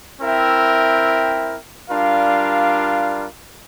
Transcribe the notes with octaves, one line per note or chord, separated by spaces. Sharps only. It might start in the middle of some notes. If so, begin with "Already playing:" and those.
C4 E4 A#4 E5 G5
G3 D4 F4 A#4 F5